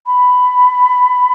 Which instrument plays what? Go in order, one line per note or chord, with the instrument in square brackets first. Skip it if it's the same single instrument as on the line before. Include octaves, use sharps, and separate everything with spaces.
[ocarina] B5